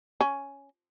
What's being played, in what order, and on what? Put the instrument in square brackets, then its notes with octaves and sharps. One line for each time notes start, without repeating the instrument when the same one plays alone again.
[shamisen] C#4